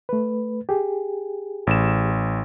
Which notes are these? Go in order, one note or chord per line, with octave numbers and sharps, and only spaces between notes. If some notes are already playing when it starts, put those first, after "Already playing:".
A3 B4
G4 G#4
A1 E7